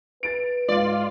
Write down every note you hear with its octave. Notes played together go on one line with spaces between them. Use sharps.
B4 A6 D7
G#2 F4 D5 D7